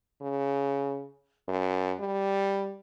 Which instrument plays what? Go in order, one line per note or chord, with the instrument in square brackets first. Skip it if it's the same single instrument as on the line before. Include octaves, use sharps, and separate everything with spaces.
[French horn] C#3
F#2
G3